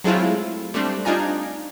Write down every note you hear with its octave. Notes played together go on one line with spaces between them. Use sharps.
F#3 G#3 A3 C4 E4 F4
G3 A3 C4 D4
D4 D#4 F4 G#5 A#5